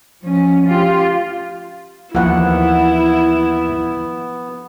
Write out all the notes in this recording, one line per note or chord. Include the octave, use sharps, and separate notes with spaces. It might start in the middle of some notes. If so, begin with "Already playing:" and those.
F3 C#4
F4 G4
D#2 E3 F3 A#3 B3 E4 F#5